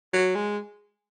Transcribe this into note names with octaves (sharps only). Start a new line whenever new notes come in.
F#3
G#3